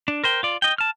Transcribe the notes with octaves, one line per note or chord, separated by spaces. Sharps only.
D4
A#4 C5 G5
F4 D5
D#5 G5
A5 F6